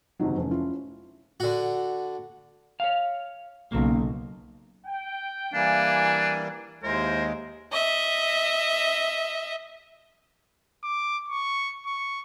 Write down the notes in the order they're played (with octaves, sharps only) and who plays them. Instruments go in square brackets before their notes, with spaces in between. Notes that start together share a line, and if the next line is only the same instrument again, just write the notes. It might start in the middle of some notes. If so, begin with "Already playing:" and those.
[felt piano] F#1 G#2 C3 D#3 F#3
F1 C#4
C#4 E4 F4
[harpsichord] D3 F#4
[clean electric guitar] C#5 F5
[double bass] B1 [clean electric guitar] C#3 F#3 A#3
[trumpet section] G5
[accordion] E3 G3 A#3 [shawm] D4 [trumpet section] G#5
[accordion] D#2 G#3 [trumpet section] E4 C5 [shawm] A#4
[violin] D#5 E5
[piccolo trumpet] D6
C#6
C#6